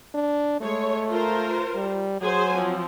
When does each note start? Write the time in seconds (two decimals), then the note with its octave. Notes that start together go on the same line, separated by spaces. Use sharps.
0.14 D4
0.61 G#3 A3 C#5
1.11 F4 A#4 C5
1.75 G3
2.21 F#3 G#4 C5 G#5
2.55 F3 C4